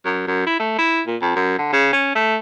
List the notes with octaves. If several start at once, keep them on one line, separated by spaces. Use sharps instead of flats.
F#2
F#2
E4
A3
E4
A#2
F2
F#2
D3
C#3
C#4
A3